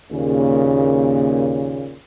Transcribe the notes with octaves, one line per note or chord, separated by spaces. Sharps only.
D#2 A#2 C#3